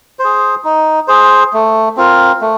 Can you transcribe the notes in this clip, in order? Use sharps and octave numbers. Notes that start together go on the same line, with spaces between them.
C5
G#4
D#4
G#4 C5
A3
C4 F4 A#4
A3